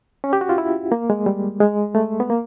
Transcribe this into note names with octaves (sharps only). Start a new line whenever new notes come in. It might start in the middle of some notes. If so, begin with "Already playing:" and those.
C#4
G4
F#4
F4
E4
A#3
G#3
G3
G#3
A3
B3
A#3